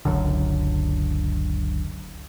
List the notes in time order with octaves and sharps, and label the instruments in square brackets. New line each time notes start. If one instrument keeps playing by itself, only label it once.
[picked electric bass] F#1 C#2 F#2 D3